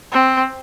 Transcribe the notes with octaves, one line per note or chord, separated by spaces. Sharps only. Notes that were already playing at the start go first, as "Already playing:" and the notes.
C4